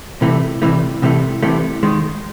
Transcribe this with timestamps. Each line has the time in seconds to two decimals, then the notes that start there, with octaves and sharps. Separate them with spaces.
0.21 C2 C3 E3 A3
0.62 C2 C3 E3 A3
1.02 C2 C3 E3 A3
1.43 C2 C3 E3 A3
1.83 D#2 D#3 G#3